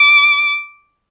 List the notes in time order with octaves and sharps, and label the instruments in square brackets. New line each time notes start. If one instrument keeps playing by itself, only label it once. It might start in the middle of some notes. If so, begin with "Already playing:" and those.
Already playing: [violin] D6